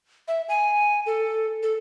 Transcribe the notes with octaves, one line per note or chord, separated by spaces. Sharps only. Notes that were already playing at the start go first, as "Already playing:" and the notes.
E5
G#5
A4
A4